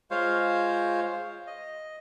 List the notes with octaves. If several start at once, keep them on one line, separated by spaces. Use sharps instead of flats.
G#3 F4 C5 C#5 F5
D#5